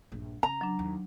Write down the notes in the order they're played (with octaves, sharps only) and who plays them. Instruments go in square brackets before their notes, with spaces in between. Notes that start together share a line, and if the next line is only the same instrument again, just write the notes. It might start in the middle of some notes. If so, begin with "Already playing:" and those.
[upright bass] A#1 G2
[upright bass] C#3 [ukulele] A#5
[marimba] F#3 D4
[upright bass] D#2